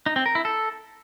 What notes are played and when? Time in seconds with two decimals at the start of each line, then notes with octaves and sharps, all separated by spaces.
0.06 D#4
0.16 C4
0.26 A#4
0.35 E4
0.45 A4